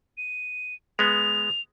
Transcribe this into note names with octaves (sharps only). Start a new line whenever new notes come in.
D#7
G#3 B3 F7